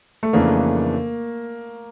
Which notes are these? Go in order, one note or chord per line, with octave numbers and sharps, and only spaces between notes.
A3
F2 C#3 E3 A3 A#3 D4